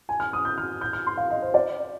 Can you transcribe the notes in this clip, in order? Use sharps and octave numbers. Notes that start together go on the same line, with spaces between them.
G#5
F6
D#6
G6
F6
G6
F6
C6
F5
D#5
C5
D5